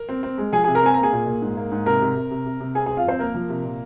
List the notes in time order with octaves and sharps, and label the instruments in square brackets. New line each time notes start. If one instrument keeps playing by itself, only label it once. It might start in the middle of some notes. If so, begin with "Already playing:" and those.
Already playing: [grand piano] A#4
C4
C4
G#3
F3 G#4 G#5
C3 G#4 G#5
A#4 A#5
C4 G#5
A#5
A#3
G#4 G#5
A#2
A#2
G#2
A#3
G#2
C3 A#4 A#5
C3
C3
C3
C3
C3
C4 G#4 G#5
C4 G#4 G#5
F4 F5
F2 C4 C5
A#3 A#4
F3
C3
A#2